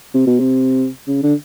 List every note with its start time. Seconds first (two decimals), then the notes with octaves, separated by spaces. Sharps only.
0.14 C3
0.27 B2
0.40 C3
1.07 C#3
1.23 D3